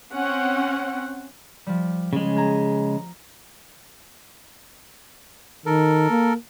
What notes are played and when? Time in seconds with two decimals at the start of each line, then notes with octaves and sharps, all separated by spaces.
0.13 C4 C#4 F#5
1.67 F3 G3
2.13 C#3 G#3
2.36 A#5 G#6
5.66 D#3 A4 A#4
6.10 A#3